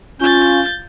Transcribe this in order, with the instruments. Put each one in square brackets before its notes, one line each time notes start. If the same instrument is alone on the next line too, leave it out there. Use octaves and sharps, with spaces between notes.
[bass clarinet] C#4 [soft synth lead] F4 [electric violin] G6 A6